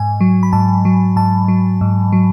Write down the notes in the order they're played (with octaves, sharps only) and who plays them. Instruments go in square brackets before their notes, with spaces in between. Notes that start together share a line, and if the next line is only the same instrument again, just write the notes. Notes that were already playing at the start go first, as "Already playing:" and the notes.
Already playing: [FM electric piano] G#2 G#5
F#3
B5
G#2 A5
F#3
G#2 A5
F#3
G#2
F#3